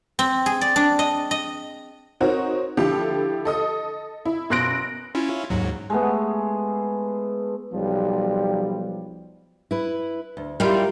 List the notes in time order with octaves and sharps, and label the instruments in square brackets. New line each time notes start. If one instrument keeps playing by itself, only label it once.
[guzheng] C4
G#4
D5
D4
D#5
D#5
[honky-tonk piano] C4 D#4 F#4 A#4 C#5
D3 F3 E4 G4 A4
A4 D#5 D#6
E4
F#2 B2 C6 F#6 A#6 D7
[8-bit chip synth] C#4 E4 F4
D#2 G#2 F#3
[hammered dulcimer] G#3 A3 B3
[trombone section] B1 F3 G3
[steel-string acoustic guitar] E4 B4
D2
[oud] G3 E4 F4 [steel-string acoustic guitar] A#4